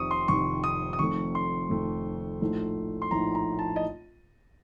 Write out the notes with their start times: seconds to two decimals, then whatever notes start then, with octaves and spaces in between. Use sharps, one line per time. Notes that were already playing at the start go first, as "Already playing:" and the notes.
Already playing: F1 F2 C3 D#3 C#6 D#6
0.11 C6
0.28 F1 F2 C3 D#3 C#6
0.64 D#6
0.93 D#6
0.99 F1 F2 D#3 A3 C#6
1.35 C6
1.70 F1 F2 D#3 A3
2.41 A#1 A2 A3 D#4
3.02 C6
3.11 A#1 A2 A3 D#4 A#5
3.35 A#5
3.59 A5
3.76 D#5